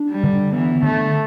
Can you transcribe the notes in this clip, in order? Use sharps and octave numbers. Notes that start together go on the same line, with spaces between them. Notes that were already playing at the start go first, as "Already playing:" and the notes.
Already playing: D4
G3
D3
E3 B3
D3 A3